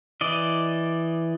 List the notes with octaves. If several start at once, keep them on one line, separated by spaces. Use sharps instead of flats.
E3 D5 D#5